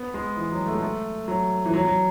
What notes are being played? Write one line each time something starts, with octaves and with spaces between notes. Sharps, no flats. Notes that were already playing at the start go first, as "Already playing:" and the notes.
Already playing: B3
G#3
E3
F#3
A3
G#3
A3
F#3
E3
F#3
F#3